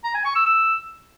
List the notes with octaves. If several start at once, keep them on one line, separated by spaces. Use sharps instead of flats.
A#5
G#5
C#6
E6
E6